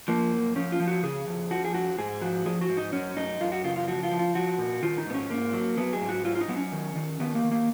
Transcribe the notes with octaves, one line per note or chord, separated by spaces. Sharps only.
F3 A#3
F#2
F3 C#4
F4
F3
F#4
C#3 G#4
F2
F3 F#4
G#4
F2 F#4
G#2 G#4
F3 F#4
F3 G#4
F#4
G#2
D#4
F#2 C#4
F#2 D#4
F#2 F4
F#4
C#3 F4
F4
F3 F#4
F4
F3
F4
F3 F#4
A#2
D#3 F4
D#4
G#2 B3
C#4
G#2 A#3
F#3
F#3 B3
G#4
G#2
F#4
F#3 F4
F4
D#4
F#3 B3
C#4
D#3
D#3
D#3 B3
A#3
D#3
A#3